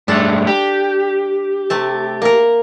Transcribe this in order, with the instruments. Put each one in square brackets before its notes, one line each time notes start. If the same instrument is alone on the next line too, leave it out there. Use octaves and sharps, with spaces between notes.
[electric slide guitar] G2 G#3 A3 [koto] D4 A4
[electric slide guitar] G4
[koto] C3 A3 A5
A#3 A#4